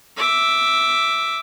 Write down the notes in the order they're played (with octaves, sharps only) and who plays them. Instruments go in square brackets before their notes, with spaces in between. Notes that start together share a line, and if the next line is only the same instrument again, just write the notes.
[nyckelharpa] E5 D6